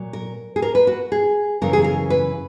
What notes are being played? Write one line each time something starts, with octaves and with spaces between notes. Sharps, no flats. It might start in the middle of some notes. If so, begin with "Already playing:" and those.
Already playing: A#2 F#3
A#4
G#4
A#4
B4
F#4
G#4
F#2 C#3 E3 A#4
G#4
A#4
B4